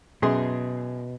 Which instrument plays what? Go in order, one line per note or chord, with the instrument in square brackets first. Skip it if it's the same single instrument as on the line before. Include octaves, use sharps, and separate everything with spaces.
[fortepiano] F#2 G#4 C6 [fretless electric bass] B2